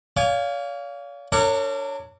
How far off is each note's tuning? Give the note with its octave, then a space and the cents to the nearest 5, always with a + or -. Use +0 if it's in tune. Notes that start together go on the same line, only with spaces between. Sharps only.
C#5 +45 F5 +0 G#5 -15
D4 +0 A#4 -40 C#5 +0